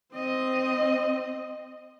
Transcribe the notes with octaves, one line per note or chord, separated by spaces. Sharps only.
C4 D#5